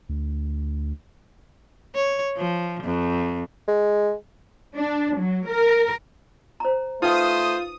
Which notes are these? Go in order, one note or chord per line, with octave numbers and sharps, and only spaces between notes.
D2
C#5
F3
F2
G#3
D4
F#3
A#4
C5 A#5
A3 D#4 F4 B4 C5 G5 D#6